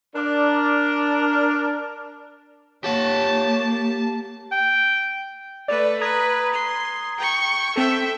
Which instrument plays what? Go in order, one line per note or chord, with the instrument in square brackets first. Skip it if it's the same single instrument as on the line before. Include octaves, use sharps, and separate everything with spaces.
[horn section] D4 A#4 D5
[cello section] A#3 [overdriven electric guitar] G4 F#5 [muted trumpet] C#5 [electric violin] A5
[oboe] G5
[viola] A3 B4 [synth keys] D5
[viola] B4 [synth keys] A#5 D#6 G#6
[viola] C6
G5 C#6
[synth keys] C4 A4 [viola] E5 G5